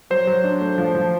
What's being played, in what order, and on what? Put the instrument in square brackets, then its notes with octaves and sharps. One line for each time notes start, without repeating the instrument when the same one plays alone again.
[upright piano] F#3 [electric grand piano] C5
[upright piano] F#3
D4
A3
F3
F3